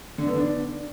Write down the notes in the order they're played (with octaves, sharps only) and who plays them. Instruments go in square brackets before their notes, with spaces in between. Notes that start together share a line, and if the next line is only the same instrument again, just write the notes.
[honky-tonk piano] D3
B3
D4